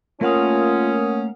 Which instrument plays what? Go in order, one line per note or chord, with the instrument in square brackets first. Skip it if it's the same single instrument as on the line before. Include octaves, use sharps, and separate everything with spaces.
[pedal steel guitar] A3 A#3 F5 [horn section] C#4 [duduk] F4 [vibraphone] A#4 F#5 D#6